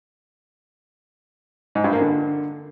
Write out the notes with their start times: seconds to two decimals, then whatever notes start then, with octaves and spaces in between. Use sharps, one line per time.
1.75 G#2
1.84 G2
1.93 A#3
2.01 D3